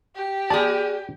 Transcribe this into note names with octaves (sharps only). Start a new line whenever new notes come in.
G4
G#4 D5 A5